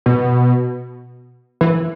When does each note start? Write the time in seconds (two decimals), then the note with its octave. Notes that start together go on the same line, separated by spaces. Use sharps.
0.06 B2
1.61 E3